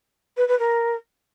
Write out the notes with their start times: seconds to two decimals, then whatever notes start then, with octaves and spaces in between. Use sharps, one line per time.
0.37 B4
0.48 B4
0.59 A#4